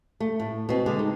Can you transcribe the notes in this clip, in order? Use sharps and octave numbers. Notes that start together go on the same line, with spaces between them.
A3
A2
B2 C4
D3 G#3
D#4